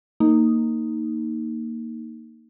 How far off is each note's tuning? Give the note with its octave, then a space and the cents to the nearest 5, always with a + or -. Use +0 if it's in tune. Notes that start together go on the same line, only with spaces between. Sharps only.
A#3 -10 D#4 +0